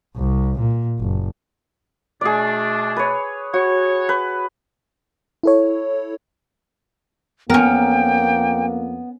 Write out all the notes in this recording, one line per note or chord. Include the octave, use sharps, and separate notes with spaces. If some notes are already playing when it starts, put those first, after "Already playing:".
C2
A#2
F#1
B2 A3 D4 G#4 D5
B4 C#5
F#4 C#5
B4
E4 A4 C#5
F2 A#3 B3 C#4 A#4 G5